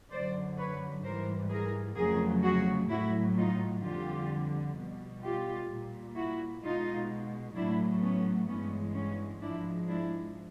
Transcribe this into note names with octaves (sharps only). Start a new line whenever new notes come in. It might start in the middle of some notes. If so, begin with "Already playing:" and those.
F#2 D3 F#3 C5 D5
B4 C#5
G#2 E3 G3 A#4 C5
G#4 A#4
F2 C#3 F#3 A3 G#4 A#4
F#4 G#4
A2 F#3 A3 E4 F#4
D#4 F4
F2 D3 G3 F4 G4
B2 G3
F4 G4
A#2 G3
E4 F#4
B2 G#3 D#4 F4
A2 F#3 A3 D4 E4
B3 C#4
G2 E3 G#3 B3 C#4
B3 C#4
G#2 F3 G#3 D4 E4
D4 E4